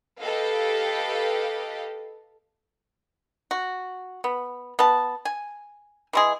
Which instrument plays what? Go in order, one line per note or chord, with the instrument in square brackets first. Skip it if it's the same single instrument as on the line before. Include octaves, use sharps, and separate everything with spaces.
[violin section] G4 A4 B4 D#5 F5
[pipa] F#4
B3
B3 A5
G#5
E3 G#3 G#4